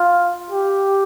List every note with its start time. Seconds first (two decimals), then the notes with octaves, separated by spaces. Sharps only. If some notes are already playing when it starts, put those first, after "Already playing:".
Already playing: F4
0.50 G4